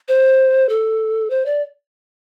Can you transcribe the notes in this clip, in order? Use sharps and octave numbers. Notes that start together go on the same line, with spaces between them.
C5
A4
C5
D5